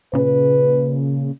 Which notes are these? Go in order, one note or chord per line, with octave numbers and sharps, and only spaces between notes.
A#2 C#3 B4